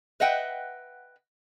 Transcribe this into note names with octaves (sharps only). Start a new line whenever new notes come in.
B4 D#5 E5 F#5 G5